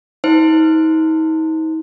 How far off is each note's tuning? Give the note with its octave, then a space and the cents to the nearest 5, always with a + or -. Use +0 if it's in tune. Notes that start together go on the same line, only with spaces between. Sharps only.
D#4 +40 C5 -15